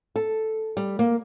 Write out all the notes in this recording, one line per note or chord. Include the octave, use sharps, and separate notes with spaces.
A4
G3
A#3